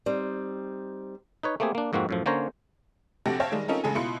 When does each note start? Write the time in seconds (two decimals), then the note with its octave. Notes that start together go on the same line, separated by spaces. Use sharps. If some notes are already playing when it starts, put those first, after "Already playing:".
0.06 G3 C4 D#4
1.43 D#4 B4 C#5
1.60 A3 A#3 C4 G4 G#4
1.75 A#3 D4
1.93 F2 G#2 A#3 C4 F#4
2.09 F#2 A2 F3
2.26 D3 A#3 C#4 C5 C#5 A#5
3.26 A#1 C3 F#4 G4 A4 A#6
3.40 C5 C#5 E5 F5 G5 A5
3.52 D#3 G3 G#3
3.68 C4 C#4 D#4 F4 A4 A#4
3.84 A1 C#3 G#3 A4 G#5
3.95 B2 E4 F4 B5 C6 C#7